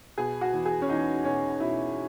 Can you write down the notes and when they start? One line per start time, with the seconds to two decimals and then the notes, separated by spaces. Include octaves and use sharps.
0.18 B2 G#4
0.41 F#4
0.53 E2
0.66 G#4
0.82 C#4
0.89 E2 D#4
1.24 B2 C#4
1.60 B2 E4